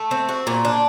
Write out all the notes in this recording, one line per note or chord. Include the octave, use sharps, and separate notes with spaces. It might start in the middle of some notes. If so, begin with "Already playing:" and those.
Already playing: A3
C4
F#4
A#2
D4